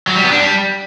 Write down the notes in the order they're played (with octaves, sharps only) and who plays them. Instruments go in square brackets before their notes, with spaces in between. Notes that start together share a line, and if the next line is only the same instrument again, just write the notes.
[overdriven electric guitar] F#3
G3
B3
D4
G3